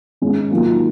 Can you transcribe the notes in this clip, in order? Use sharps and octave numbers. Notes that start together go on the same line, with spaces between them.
G#2 D#3 G#3 C#4
D#3 F#3 A#3 F4